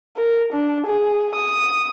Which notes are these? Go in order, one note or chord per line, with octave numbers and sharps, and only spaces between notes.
A#4
D4
G#4
D#6